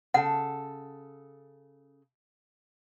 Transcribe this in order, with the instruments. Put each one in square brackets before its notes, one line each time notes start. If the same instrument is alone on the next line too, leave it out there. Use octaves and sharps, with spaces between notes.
[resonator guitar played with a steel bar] C#3 A4 [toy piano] F#5